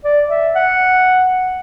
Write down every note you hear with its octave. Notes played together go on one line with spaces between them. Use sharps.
D5
E5
F#5